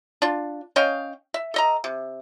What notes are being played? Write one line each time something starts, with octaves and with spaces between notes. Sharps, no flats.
D4 F4
C#4 D#5 F5 G5
E5
A4 D#5 A#5
C3